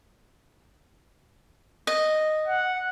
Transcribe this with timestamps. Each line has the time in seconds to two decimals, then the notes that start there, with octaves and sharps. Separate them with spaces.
1.87 D#5
2.48 F#5